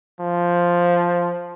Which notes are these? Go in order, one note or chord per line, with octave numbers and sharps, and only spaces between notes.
F3